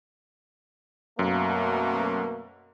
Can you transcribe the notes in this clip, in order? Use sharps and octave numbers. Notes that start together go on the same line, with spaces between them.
F#2 B2 A3 A#3